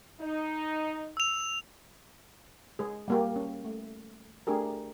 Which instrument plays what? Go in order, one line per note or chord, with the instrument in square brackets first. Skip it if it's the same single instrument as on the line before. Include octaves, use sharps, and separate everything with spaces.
[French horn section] D#4
[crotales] E6 F7
[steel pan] G#3 G#4
G3 A#3 G4
C#4
A3
A3 D4 G4 G#4 A#4